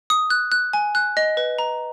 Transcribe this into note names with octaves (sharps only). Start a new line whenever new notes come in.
D#6
F#6
F#6
G#5
F#6
D#5
B4
A#5